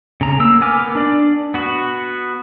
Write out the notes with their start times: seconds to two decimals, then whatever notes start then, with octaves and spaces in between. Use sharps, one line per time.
0.21 C#3 A#5
0.40 A#3 E6
0.61 B3 A#4 G#5 D6 F6
0.95 D4 D5
1.54 B3 F#4